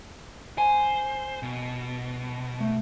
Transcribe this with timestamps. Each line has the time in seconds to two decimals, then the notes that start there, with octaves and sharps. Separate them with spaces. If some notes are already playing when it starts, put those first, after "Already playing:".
0.58 C5 G#5
1.43 B2
2.60 A3